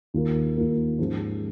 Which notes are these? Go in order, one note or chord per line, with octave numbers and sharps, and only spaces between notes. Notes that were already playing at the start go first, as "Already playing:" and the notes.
D#2 D#3 A#3 F4 A#4
D#2 D#3 A#3 F4 A#4
G#2 F3 G#3 C#4